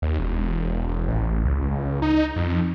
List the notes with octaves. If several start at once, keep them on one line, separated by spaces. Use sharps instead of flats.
D#2
E1
E1
A1
C#2
D#4
F2